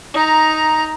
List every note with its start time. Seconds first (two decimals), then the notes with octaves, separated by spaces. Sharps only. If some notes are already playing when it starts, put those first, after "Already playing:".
0.14 D#4 A#5